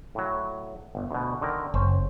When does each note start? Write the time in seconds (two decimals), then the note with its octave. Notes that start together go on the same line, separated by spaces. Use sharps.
0.15 A2 F#3
0.95 G1
1.11 D2 B2
1.41 D3 D#3 A#4
1.74 F#1 C#4 C5